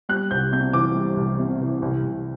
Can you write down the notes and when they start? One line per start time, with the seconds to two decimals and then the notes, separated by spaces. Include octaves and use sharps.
0.09 G3 F#6
0.31 C2 G6
0.52 C3 G6
0.73 E3 D6
0.95 G3
1.16 C2
1.39 C3
1.61 E3
1.82 C2
2.03 C2